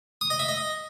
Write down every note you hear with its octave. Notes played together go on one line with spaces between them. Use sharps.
D#6
D#5
E5
D#5